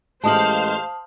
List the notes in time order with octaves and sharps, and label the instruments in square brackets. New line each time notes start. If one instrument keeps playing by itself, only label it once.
[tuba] A1 [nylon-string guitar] G#3 G4 [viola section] C5 F5 [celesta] A5 D#6 F#7